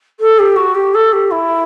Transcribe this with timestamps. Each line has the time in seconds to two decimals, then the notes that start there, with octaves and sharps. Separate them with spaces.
0.20 A4
0.39 G4
0.56 F#4
0.75 G4
0.94 A4
1.12 G4
1.31 E4